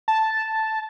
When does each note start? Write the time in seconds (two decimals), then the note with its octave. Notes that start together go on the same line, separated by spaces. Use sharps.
0.08 A5